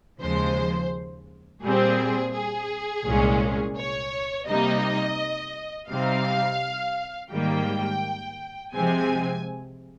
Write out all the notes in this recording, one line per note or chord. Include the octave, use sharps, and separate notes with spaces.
D#2 C#3 F3 G#3 C5
A#2 G3 C4 G#4
G#4
C2 A#2 G#3 C#4
C#5
C3 G3 A#3 D#4 D#5
C3 G3 C4 D#4 F5
G#2 D#3 G3 A#3 G5
C3 F3 G#3 C4 G#5